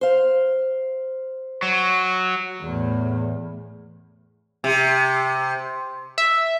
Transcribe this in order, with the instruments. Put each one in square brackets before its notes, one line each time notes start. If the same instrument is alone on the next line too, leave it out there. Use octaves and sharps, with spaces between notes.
[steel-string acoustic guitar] C5 F5
[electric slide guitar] F#3
[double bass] E2 A2
[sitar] C3
[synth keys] E5